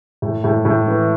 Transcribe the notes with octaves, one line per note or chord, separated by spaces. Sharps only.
A2
A2
A2
E3